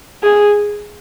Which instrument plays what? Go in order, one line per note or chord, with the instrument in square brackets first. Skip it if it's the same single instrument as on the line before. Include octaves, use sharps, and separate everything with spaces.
[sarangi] G#4